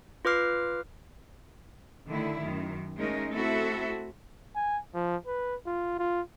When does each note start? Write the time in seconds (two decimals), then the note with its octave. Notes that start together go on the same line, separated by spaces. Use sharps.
0.25 F4 B4 D6 F6 C7
2.08 D3 D#3 A3 E4
2.37 F#2 D#3
2.98 G#3 A3 C#4 D#4 A#4
3.32 A3 C4 E4 F#4 A4 E5
4.55 G#5
4.94 F3
5.27 B4
5.66 F4
5.99 F4